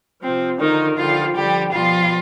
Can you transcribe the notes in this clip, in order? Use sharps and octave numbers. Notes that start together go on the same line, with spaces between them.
C3 F3 C4
D3 D#3 F3 D#4
D3 F3 G3 F4
D3 F3 G3 G4
B2 F3 G3 F4